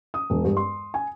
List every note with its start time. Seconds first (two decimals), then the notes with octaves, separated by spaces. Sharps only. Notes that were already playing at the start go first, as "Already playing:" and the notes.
0.14 D#6
0.30 E1
0.44 G2
0.57 C6
0.94 G#5